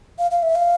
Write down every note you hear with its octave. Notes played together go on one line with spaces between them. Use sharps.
F5
F5
E5
F5